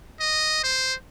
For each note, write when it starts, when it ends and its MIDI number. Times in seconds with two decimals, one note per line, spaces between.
0.20 0.62 75
0.64 0.94 72